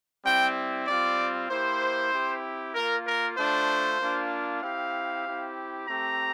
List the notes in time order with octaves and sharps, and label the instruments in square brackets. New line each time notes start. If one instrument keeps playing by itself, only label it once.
[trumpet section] G3 C4 E4 G5
G3 C4 F4 D5
A#3 E4 G4 C5
C4 E4 G4
A#3 F4 A#4
A#4
A3 D4 F4 C5
A#3 D4 F4
C4 E4 G4 F5
C4 E4 G4
A3 C4 G4 A#5